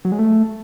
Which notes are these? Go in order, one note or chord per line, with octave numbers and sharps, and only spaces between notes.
F#3
G#3
A3